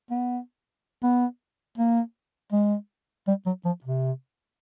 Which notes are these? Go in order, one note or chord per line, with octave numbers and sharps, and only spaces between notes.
B3
B3
A#3
G#3
G3
F#3
F3
C3